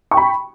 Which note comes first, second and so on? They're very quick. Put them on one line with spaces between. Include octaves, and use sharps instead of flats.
C#6 G5 B5